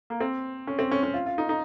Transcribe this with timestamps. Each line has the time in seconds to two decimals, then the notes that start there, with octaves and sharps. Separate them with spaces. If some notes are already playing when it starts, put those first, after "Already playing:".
0.10 A#3
0.21 C4
0.67 C#4
0.79 C4
0.91 C#4
1.03 C#4
1.14 F4
1.26 F4
1.38 D#4
1.49 D#4